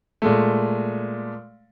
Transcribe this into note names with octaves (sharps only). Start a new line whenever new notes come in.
A#2 G#3 A3